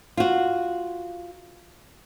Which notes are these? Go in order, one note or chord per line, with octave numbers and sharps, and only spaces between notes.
F4 F#4